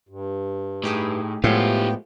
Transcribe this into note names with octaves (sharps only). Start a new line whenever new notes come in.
G2
A2 D#4 G4 G#4
A2 F3 G#3 A3 B3 F4 G4 G5